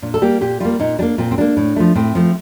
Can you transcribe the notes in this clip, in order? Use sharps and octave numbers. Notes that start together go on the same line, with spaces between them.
A#2 D4
A4
G3 A#3 G4
A#2 G4
G3 A#3 F4
A#2 D#4
G3 A#3 D4
A#2 C4
C4
G3 A#3 D4
A2
F3 A3
A2 C4
F3 A3